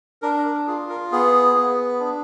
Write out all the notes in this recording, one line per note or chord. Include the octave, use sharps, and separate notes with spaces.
D4 A#4
A#4
F4 G#4
A#4
B3 G#4
B3
D4